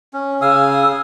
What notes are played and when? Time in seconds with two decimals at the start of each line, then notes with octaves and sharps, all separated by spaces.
0.14 C#4
0.41 C#3 F5 G#5 D#6 E6